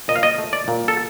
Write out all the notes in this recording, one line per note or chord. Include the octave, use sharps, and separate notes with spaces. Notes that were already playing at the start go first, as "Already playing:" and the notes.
A#2 D#5
F5
D#5
A3
D5
A#2
A4